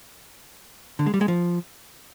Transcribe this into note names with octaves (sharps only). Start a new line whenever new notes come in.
D3
G#3
G3
G#3
F3